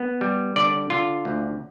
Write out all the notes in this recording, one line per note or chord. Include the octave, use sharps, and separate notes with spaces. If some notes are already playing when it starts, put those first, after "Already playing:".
Already playing: B3
G3
D3 D5
D3 F4
D2